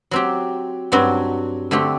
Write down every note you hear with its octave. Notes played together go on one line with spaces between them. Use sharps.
F#3 C4 G4
G2 F#3 C4 F#4
D3 A3 C4 G4